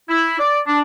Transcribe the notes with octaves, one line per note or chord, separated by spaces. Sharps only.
E4
D5
D4